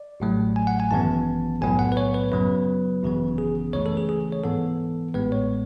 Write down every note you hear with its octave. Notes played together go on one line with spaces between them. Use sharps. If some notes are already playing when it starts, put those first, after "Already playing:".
Already playing: D5
A1 A2 F#3 A3
G#5
F#5
G#5
G#1 F#2 E3 B3 A5
B1 A2 F#3 B3 G#5
F#5
B4
C#5
B4
F#2 C#3 F#3 B3 B4
G#1 F#2 C#3 E3 B3
G#4
C#2 C#3 E3 A3 C#5
A4
G#4
G#4
C#5
G#2 E3 B3 A4
A1 A2 G#3 B3 B4
C#5